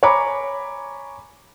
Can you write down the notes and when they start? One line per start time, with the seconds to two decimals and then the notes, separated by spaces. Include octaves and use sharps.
0.03 C#5 G#5 A#5 B5 D6